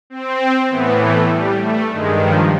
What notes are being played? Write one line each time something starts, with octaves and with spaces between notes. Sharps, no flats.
C4
A2 E3 B3
A3
G3
A3
G2 D#3 G#3
F3